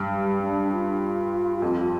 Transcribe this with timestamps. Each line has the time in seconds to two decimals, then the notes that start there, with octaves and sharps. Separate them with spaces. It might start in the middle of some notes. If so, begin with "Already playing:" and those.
Already playing: G2
0.12 G3
0.41 D4
0.72 F4
1.62 F2